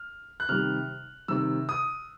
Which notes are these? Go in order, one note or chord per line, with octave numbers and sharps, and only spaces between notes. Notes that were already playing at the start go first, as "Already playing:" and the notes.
Already playing: F6
F#6
C3 D#3 G3 F6
C3 D#3 G3 E6
D#6